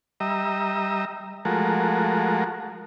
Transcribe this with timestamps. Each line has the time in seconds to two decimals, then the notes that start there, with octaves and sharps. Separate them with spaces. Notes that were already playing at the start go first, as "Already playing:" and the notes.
0.20 G3 D#5 E5 A#5
1.45 F3 G#3 A3 F#4 A#4